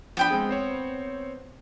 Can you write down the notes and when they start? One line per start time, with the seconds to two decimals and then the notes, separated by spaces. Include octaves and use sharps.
0.17 F3 B3 D4 G5 B5
0.31 G#3 C4 G#4
0.49 C4 C5 C#5